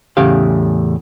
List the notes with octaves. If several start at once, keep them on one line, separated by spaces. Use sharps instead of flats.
E2 A2 C#3 G4 F5